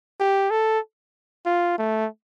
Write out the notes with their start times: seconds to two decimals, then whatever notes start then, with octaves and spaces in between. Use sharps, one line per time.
0.20 G4
0.50 A4
1.46 F4
1.78 A3